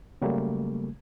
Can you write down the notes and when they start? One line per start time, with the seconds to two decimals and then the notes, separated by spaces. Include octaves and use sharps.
0.22 C#3 F#3 G3 A3 A#3